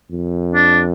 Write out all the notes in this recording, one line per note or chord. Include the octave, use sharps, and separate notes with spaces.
F2
D4